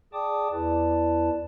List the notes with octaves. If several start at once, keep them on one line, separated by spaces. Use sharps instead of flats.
G#4 D5 G5 A5 D6 D#6
E2 E4 B4 D5 A5